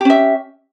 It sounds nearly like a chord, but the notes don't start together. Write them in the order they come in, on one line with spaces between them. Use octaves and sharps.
G4 C#4 E5